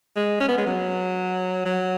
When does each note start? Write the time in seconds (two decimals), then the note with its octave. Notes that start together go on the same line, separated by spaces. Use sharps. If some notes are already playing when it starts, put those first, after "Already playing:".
0.17 G#3
0.40 C#4
0.49 B3
0.58 G#3
0.66 F#3
1.65 F#3